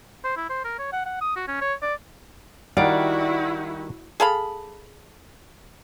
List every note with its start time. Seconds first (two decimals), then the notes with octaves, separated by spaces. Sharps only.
0.24 C5
0.36 E4
0.49 C5
0.65 A#4
0.79 C#5
0.93 F#5
1.06 F#5
1.21 D#6
1.36 F#4
1.48 C#4
1.61 C#5
1.82 D5
2.77 D#3 G3 E4 F#4 D5 F5 F#5 D7
4.20 G#4 A4 F5 B5